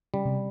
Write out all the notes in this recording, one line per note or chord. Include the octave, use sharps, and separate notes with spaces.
C#3 G3
C3